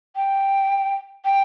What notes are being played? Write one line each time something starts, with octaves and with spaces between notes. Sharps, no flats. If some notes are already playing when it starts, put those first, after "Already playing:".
G5
G5